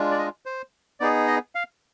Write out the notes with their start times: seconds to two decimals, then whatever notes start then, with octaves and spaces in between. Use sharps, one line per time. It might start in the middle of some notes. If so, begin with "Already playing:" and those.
Already playing: G#3 D4 F4
0.11 D5
0.18 D#5
0.46 C5
1.00 B3 D#4 G#4 D5
1.27 D#5
1.55 F5